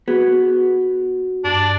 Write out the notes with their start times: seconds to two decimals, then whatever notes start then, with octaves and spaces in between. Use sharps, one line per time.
0.08 B3 F#4 G#4
1.44 G2 D4